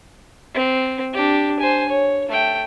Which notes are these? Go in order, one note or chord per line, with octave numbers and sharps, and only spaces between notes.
C4
D4 G4
C5 G#5
C#5
A3 G5